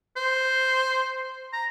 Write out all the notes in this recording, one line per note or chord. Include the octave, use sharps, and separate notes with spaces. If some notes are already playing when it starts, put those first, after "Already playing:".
C5
A#5